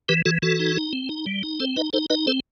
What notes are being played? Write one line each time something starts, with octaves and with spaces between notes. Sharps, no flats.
E3 G4 B4
E3 F#4 A4
E3 F#4 A4
D#4
D#4
C4
D#4
G3
D#4
C4 A4 C5
D#4 B4 D#5
D#4 A4 C5
D#4 B4 D#5
C4 A4 C5